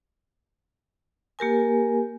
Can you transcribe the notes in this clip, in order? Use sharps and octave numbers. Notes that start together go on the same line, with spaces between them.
A#3 G4 A#4 G#5